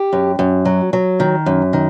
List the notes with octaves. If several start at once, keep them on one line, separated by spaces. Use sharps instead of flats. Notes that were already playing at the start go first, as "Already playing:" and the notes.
Already playing: G4
F#2
F#2
F#3
F#3
D#3
F#2
D#3